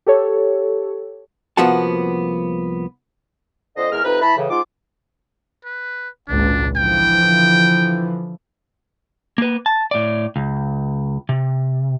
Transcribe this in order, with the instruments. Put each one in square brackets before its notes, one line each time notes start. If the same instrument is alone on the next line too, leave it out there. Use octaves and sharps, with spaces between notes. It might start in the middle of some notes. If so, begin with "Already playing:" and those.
[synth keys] G4 A4 C#5
[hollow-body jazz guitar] C2 F3 A#3 B3 F#4 A5
[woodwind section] F2 D3 C5 D#5
E2 G#3 A#4 F6
F2 C3 D#4 B4
E3 E4 A5 B5
A2 C#3 E3
G#2 F4 D6
[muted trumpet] B4
[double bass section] G#1 C#2 A#2 [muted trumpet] D4
[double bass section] D3 E3 F3 [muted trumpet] G5
[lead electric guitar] A#3 B4
A5
A2 D5
C#2
C3